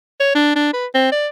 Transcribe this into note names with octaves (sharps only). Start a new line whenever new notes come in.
C#5
D4
D4
B4
C4
D5